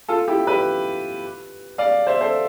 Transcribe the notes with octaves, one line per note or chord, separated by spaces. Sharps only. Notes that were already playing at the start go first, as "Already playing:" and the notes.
F4 A4
E4 G4
G4 B4
D5 F5
C5 E5
A4 C5